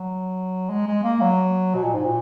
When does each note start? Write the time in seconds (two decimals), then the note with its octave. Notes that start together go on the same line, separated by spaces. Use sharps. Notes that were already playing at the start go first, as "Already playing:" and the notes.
Already playing: F#3
0.69 G#3
0.87 G#3
1.03 A#3
1.21 F#3
1.75 B2
1.84 A#2
1.94 G#2
2.05 A#2